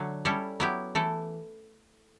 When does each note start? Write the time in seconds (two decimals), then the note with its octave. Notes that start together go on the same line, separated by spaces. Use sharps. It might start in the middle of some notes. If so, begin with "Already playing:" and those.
Already playing: D3 F#3 A3
0.25 G3 C#4 E4 A4
0.60 F#3 B3 E4 G4
0.95 E3 A3 E4 A4